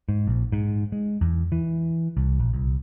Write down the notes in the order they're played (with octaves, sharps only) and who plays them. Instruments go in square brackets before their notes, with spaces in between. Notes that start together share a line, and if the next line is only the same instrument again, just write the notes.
[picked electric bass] G#2
A#1
G#2
G#3
E2
E3
C2
A#1
C2